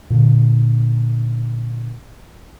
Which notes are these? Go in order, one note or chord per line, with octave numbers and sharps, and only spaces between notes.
A#2 D3